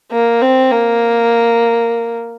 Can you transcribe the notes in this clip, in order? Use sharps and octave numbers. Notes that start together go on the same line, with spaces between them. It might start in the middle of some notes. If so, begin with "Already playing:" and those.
A#3
C4
A#3